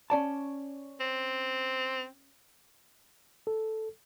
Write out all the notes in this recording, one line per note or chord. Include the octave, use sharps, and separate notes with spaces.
C#4 D5 A5
C4
A4